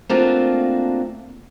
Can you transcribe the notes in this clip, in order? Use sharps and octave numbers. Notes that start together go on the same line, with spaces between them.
A3 A#3 C4 D4 F4 F#4